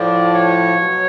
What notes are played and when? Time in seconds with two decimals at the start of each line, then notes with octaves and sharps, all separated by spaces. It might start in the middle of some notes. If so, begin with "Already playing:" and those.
Already playing: A2 F3 D5
0.35 C#5
0.75 B2 F#3